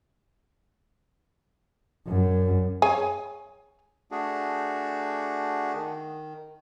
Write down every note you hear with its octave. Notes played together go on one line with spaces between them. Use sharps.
F#2
G#4 C#5 G#5
A3 D4 F#4 G#4
D#3